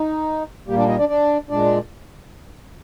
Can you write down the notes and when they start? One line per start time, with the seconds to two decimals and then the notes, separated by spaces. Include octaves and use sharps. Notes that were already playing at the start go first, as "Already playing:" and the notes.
Already playing: D#4
0.67 A#2 G3 A#3 G4
0.77 D4 D5
0.88 D#4 D#5
0.98 D4 D5
1.09 D4 D5
1.50 A#2 G#3 D4 D5